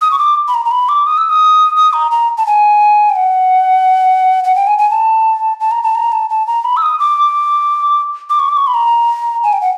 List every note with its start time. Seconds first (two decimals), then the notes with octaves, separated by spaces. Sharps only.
0.01 D#6
0.11 C#6
0.19 D6
0.48 B5
0.54 A#5
0.65 A#5
0.71 B5
0.89 D6
1.06 D#6
1.18 E6
1.29 D#6
1.76 D#6
1.93 A#5
2.11 A#5
2.38 A5
2.47 G#5
3.10 G5
3.16 F#5
4.44 F#5
4.56 G5
4.67 G#5
4.79 G#5
4.91 A5
5.60 A5
5.71 A#5
5.83 A5
5.95 A#5
6.12 A5
6.30 A5
6.47 A#5
6.64 B5
6.77 E6
6.82 D#6
6.99 D6
8.30 D6
8.39 C#6
8.49 D6
8.57 C#6
8.67 B5
8.74 A#5
9.44 G#5
9.53 G5
9.61 F#5